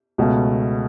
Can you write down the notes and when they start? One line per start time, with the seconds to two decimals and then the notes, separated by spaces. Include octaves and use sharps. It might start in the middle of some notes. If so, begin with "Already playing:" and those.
0.18 C#2 B2 A3